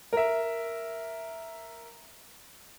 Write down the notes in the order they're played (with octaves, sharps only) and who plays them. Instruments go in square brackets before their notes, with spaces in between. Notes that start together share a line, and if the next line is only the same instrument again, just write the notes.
[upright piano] A#4 E5